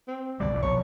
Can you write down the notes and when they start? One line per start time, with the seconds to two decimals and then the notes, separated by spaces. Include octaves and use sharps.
0.08 C4
0.40 D2 B2 G3 D5
0.51 B1 D#3 E3
0.63 A#1 B2 C#5